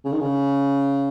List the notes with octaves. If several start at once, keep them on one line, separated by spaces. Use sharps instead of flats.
C#3
D#3
C#3